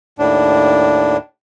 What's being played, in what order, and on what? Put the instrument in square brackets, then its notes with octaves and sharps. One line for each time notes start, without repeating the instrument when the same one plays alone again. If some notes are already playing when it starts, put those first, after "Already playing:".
[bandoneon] D#2 A2 D4